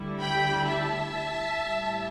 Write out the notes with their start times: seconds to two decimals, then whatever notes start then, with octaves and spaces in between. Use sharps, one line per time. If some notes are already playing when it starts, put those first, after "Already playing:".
Already playing: D2 D3 G3 E4
0.21 G5 B5
0.68 E5 A5
1.62 A2 G3 E4